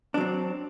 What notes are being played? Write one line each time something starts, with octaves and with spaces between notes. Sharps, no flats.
F#3 C4 D4